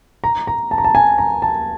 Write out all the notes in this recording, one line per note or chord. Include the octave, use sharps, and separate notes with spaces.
A#5
A#5
A5
A#5
A5
G#5
A#5
A5